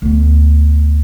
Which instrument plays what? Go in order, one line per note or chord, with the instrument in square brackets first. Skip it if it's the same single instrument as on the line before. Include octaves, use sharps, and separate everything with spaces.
[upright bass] D2 B3